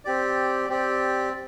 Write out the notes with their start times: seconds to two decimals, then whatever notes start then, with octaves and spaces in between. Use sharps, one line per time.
0.05 C4 G4 D5
0.69 C4 G4 D5